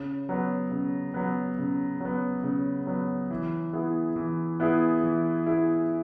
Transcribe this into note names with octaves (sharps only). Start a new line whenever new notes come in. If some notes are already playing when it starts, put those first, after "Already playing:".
Already playing: C#3
F#3 B3
C#3
F#3 B3
C#3
F#3 B3
C#3
F#3 B3
E3
B3 E4 G#4
E3
B3 E4 G#4
E3
B3 E4 G#4